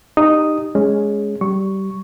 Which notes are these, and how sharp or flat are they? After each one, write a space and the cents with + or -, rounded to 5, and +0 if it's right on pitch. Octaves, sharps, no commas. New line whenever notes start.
D#4 -15 G4 +0 D#6 +0
G#3 +0 C#4 +10
G3 -25 C#6 +0